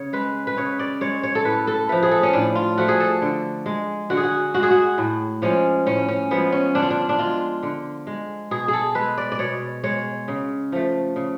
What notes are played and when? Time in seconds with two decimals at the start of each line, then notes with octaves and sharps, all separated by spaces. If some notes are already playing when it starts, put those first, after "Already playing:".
Already playing: C#3 C#5
0.13 G#3 B4
0.47 B4
0.57 C#3 C#5
0.79 D5
1.01 G#3 C#5
1.23 C#5
1.35 A4
1.45 A2 B4
1.67 A4
1.89 F3 A3 B4
2.03 G#4
2.11 A4
2.23 C#4
2.33 A2 D4
2.55 F4
2.78 F3 A3 F#4
2.88 G#4
3.00 A4
3.22 D3
3.66 G#3
4.10 D3 F#4
4.17 G#4
4.23 F#4
4.54 G#3 F#4
4.63 G#4
4.71 F#4
4.98 A2
5.42 F3 G#3 C#4
5.86 A2 C#4
6.08 C#4
6.31 F3 G#3 B3
6.52 C#4
6.75 D3 D4
6.82 F4
6.90 D4
7.09 D4
7.19 G#3 F4
7.63 D3
8.07 G#3
8.51 B2 G#4
8.68 G#4
8.73 A4
8.95 G#3 B4
9.18 D5
9.32 D5
9.39 B2 C#5
9.83 G#3 C#5
10.28 C#3
10.72 F3 A3
11.16 C#3